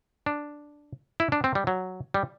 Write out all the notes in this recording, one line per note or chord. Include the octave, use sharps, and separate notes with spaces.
D4
E4
D4
C4
G3
F#3
G3